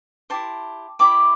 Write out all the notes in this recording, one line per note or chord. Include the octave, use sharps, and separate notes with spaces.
E4 G4 C5 A5 C6
E4 G4 D5 B5 D6